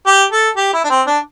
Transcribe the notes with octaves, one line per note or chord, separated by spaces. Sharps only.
G4
A4
G4
E4
D4
C4
D4